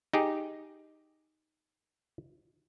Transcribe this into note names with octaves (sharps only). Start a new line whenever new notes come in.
D#4 G4 G#4